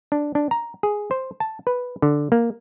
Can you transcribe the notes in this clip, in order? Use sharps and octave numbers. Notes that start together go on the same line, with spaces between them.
D4
D4
A#5
G#4
C5
A5
B4
D3
A#3